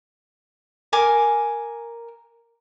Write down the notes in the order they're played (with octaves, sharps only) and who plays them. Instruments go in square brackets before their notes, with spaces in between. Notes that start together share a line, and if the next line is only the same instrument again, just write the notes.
[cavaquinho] A#4 G#5 D6